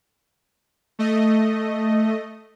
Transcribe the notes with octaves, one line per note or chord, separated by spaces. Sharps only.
A3 D#5